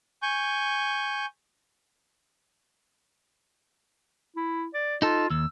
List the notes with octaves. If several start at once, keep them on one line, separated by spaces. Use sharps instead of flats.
G#5 C#6 G6
E4
D5
D#4 F4 A4
D#2 E6